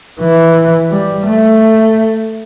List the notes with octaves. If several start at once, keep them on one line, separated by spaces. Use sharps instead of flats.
E3
G3
A3